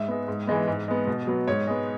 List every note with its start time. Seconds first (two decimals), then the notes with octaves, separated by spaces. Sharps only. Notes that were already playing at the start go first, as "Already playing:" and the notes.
Already playing: G#2 E5
0.08 G#3 B3
0.28 G#2
0.47 E3 G#3 B3
0.67 G#2
0.88 G#3 B3
1.07 B2
1.27 F#3 B3
1.47 G#2 C#5
1.67 G#3 B3